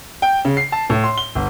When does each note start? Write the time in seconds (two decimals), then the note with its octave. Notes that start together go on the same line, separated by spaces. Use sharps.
0.22 G5
0.45 C#3
0.57 C7
0.72 A5
0.90 A2
1.04 C6
1.18 G7
1.35 G1